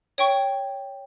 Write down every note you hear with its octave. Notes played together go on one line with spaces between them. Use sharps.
C#5 G5 C#6